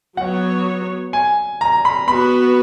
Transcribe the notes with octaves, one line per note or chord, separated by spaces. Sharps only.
F#3 B3 F#4 C#5 F#5
G#5
A#5
B5
B3 F#4 B4 B5